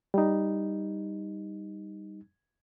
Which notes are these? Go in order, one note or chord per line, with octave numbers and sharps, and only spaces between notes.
G3 D#4